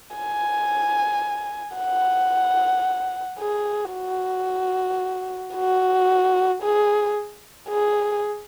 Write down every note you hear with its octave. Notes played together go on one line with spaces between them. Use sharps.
G#5
F#5
G#4
F#4
F#4
G#4
G#4